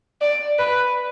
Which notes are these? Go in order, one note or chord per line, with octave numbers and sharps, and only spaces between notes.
D5
B4